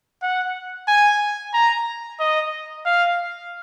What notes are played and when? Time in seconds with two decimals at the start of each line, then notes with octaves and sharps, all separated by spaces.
0.22 F#5
0.88 G#5
1.54 A#5
2.20 D#5
2.85 F5